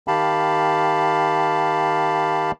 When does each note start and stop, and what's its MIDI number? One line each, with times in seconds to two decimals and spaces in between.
0.08 2.51 51
0.08 2.51 67
0.08 2.51 77
0.08 2.51 81
0.08 2.51 83